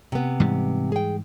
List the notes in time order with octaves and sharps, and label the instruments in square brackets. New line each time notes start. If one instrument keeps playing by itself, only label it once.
[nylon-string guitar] C3 B3
[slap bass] G#2 E3 G3
[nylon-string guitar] G#4 G5